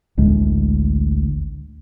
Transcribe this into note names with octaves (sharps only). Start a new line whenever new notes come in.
A1 D2 G#3